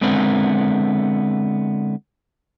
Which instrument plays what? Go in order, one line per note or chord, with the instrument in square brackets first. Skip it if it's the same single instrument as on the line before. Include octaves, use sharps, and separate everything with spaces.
[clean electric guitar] D3 G#3 B3 C4 E4 A#4